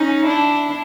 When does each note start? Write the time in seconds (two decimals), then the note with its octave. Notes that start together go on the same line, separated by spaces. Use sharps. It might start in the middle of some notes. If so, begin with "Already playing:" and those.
Already playing: C#4 D#4
0.26 D4 E4